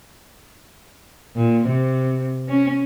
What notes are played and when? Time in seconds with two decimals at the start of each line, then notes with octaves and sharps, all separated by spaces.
1.36 A#2
1.67 C3
2.49 C#4